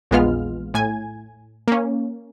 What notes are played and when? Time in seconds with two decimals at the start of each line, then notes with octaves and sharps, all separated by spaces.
0.11 A#1 E2 G#3 B3 F4 F6
0.74 A2 G#5 G#6
1.68 A#3 C#4